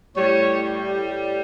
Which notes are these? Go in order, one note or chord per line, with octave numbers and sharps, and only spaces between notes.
A2 G3 C#5